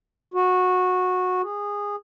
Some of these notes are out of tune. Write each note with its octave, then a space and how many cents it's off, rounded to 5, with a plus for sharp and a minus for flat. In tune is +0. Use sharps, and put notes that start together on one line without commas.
F#4 -15
G#4 -20